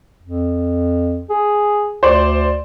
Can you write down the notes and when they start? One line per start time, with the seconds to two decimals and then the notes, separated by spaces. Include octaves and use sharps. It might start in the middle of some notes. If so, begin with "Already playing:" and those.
0.23 F2
1.30 G#4
2.03 D2 C5 D5